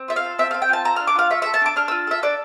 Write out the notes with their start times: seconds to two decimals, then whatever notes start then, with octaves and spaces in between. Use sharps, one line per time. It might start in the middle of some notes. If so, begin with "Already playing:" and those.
Already playing: C4
0.08 F4 E5
0.16 F5
0.24 A4
0.39 C4 E5
0.51 F5
0.54 C4
0.62 G5
0.69 F4 A5
0.85 A4 A#5
0.96 F6
1.00 D4
1.07 D6
1.15 F4 F5
1.30 A3 E5
1.42 E5
1.46 A4
1.54 A5
1.61 D4 D6
1.76 D4 F6
1.88 E6
1.91 F4
2.07 A4 E5
2.22 D4 D5